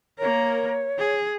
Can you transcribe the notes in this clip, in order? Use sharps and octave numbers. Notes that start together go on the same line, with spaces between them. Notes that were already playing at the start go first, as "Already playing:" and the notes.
A#3 A#4 C#5
G#4